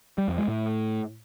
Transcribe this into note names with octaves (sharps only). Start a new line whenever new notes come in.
G3
F2
G#3
A2